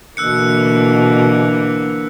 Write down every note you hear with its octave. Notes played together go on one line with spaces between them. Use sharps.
B2 D3 E3 A#3 E6 F#6 C#7